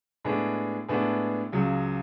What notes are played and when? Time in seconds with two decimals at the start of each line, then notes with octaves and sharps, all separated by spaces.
0.25 A2 G#3 B3 D4
0.88 A2 G#3 B3 D4
1.52 C#2 C#3 F#3